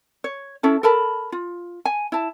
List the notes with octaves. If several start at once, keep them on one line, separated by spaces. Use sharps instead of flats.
C#5
C#4 E4 A4
A4 A#4 A5 B5
F4
G#5
E4 A5